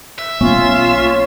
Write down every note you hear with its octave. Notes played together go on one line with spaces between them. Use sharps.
E5
B1 A#3 B3 C#4 F4